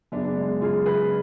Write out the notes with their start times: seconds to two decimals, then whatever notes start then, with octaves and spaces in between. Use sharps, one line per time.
0.12 F#2 B3 D4
0.16 C#3
0.24 B3 D4
0.37 G#3 B3
0.61 F#2 C#3 F4 G#4
0.85 G#4 B4